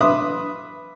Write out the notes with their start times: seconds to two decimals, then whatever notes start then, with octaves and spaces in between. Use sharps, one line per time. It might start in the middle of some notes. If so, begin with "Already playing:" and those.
0.01 B4 E5 C6 D6 D#6